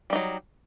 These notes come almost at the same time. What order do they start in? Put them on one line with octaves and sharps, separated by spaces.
G3 D#4 F#3